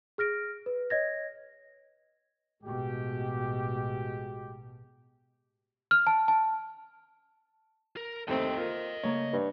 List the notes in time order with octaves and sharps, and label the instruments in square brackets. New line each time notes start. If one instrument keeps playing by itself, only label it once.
[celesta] G#4 F6 A#6 D7
B4
C#5 D#5 G#6 A#6
[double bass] A1 B2 [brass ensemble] G#3 F#4 G4
[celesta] F6
A5
A5
[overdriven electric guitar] A#4
[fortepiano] D#2 A3 C4 [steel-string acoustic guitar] A#4 C5 [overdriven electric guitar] D#5 G5
[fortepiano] A#3 F4
[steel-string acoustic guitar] C#3 A3 A#3 [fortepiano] C#5
[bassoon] G2